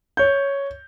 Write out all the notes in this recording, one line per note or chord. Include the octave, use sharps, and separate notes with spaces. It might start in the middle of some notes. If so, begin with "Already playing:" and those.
C#5 G6